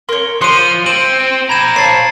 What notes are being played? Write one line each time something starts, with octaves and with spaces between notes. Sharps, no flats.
A#4 C#5 C6 G7
F3 C6 D6 F#6 C#7 D#7
C4 D7 D#7 F#7
C5 A#5 B5 G#6 E7
C#5 F5 A5 A6 C7